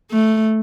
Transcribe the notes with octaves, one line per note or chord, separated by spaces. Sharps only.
A3